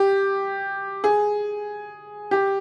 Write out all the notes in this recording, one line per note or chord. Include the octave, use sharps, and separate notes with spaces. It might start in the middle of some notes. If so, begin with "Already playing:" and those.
Already playing: G4
G#4
G4